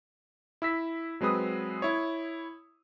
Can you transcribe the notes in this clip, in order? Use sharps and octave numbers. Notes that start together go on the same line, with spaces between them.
E4 E6 B6
F#3 G#3 C4 B4 D#6
E4 C#5